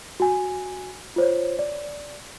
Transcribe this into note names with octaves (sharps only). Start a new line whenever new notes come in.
F#4 G#5
F4 C5 C#5
D5